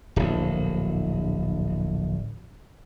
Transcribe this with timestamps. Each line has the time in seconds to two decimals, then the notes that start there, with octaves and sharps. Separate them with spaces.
0.16 D1 A#1